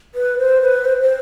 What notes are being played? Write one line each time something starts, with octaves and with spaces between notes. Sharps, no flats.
B4
C5
B4
C5
C5